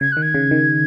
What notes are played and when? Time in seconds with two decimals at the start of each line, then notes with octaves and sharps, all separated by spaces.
0.01 C#3 G#6
0.12 D#3 F#6
0.22 G#6
0.35 C#3
0.51 D#3